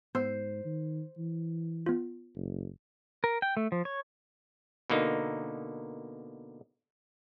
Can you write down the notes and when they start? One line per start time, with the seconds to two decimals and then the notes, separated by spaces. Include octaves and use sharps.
0.15 G#2 B3 C5 E6
0.65 D#3
1.17 E3
1.86 B3 F4
2.35 F#1
3.24 A#4
3.42 G5
3.57 A3
3.72 F3
3.85 C#5
4.90 B2 D3 A#3 D#4